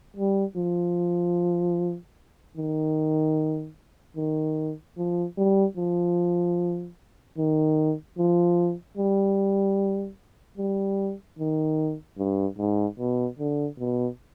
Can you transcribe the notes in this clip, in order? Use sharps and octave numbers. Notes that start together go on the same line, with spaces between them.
G3
F3
D#3
D#3
F3
G3
F3
D#3
F3
G3
G3
D#3
G2
G#2
B2
D3
B2